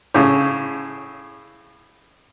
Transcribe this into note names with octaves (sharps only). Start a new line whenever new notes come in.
A2 C#3